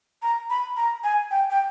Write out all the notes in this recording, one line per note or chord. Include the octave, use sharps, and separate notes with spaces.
A#5
B5
A#5
G#5
G5
G5